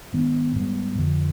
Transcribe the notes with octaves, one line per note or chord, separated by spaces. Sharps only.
G#2 D#3 B3 D4
G#2 G3 B3
F2 D3 F3